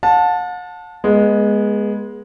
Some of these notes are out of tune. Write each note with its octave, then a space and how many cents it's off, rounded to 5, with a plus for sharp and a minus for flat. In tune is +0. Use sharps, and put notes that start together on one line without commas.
F#5 -45 A5 +0
G#3 +0 B3 -25